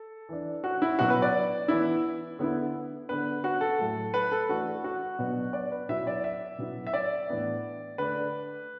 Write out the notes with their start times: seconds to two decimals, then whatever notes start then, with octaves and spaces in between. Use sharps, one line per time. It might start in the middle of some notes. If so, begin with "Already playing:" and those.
Already playing: A4
0.29 E3 D4
0.64 F#4
0.82 E4
0.99 B2 F#3 B3 F#4
1.10 B4
1.22 D5
1.68 E3 B3 E4
2.39 D3 B3 E4
3.09 D3 B3 D4 B4
3.44 F#4
3.61 A4
3.79 A2 F#3 A3
4.14 B4
4.32 A4
4.49 E3 A3 D4 F#4
4.84 F#4
5.19 B2 F#3 B3 D4
5.53 D5
5.71 B4
5.89 B2 F#3 B3 E4 E5
6.07 D5
6.24 E5
6.58 B2 F#3 B3 E4
6.87 E5
6.93 D5
7.28 A2 E3 B3 D4
7.98 D3 A3 D4 B4